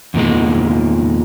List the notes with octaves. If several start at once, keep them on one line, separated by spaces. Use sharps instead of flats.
E2 A#2 D#3 G#3